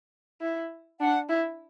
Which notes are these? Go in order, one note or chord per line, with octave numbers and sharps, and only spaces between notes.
E4
D4 F#5
E4